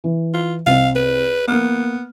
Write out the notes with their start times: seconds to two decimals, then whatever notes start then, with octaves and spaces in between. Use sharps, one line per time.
0.04 E3
0.34 F4
0.66 C2 C4 F5
0.95 B4
1.48 A#3 B3 F6